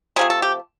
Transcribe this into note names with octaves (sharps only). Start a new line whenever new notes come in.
C3 F3 A3 G#4
A4
G4